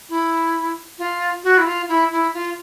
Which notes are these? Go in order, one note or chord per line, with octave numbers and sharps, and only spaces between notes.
E4
F4
F#4
E4
F4
E4
E4
F4